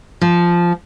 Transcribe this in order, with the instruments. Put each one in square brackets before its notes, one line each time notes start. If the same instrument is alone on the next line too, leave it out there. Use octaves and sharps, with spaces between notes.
[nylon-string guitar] F3